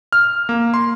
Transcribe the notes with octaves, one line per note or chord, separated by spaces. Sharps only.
F6
A#3
C6